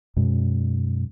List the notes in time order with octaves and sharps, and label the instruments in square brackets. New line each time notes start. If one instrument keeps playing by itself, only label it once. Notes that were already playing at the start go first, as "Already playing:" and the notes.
[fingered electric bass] F#2 B2 G#3